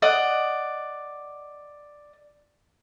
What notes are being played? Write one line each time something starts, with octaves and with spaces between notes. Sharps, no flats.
D5 D#5 F#5